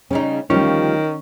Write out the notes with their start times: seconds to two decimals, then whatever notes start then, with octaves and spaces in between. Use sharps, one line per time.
0.11 C#3 G3 C#4 D#4
0.50 D2 D#3 F3 G3 C#4 F4